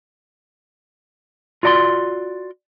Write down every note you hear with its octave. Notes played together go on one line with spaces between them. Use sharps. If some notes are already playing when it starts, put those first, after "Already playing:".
F4 F#4 D5 A#5 C6